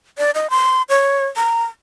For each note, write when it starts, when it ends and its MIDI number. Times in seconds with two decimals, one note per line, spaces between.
0.18 0.31 74
0.35 0.50 75
0.50 0.82 84
0.89 1.26 73
1.36 1.64 82